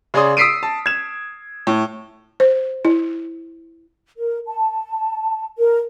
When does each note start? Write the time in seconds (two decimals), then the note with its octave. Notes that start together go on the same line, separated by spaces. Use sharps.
0.14 C#3 G#4 D5 C6 D#6
0.37 D#6 E6 B6 C7 D7 D#7
0.63 A5
0.86 G#6 E7
1.67 A2
2.40 C5
2.85 E4
4.17 A#4
4.47 A5
5.58 A#4